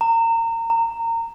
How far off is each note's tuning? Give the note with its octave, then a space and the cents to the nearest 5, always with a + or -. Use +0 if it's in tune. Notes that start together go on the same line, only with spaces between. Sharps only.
A#5 -25
A#5 -20